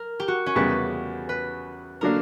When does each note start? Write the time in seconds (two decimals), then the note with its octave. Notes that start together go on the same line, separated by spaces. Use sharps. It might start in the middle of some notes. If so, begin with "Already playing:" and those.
Already playing: A#4
0.20 G4
0.28 F#4
0.46 C#4
0.56 E2 C#3 G3 B4
1.29 B4
2.01 D3 F#3 A#3 D4 A#4